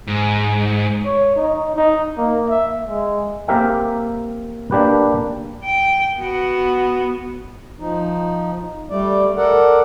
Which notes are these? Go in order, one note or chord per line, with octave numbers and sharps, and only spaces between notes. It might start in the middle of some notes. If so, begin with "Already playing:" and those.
G#2
C#5
D#4
D#4
A#3
E5
G#3
A#3 C4 G4 A#4 E5 G5
A#3 D4 G4 B4
G5
B3 F#4
F3 D#4
G3 A3 D5
A4 A#4 D5 F#5